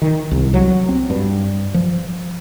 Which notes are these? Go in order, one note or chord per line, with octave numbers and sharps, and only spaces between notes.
D#3
C2
F#3
C4
G2
F3